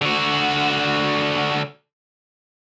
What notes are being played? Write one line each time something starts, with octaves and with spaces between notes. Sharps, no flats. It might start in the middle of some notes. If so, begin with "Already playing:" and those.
D3 F#4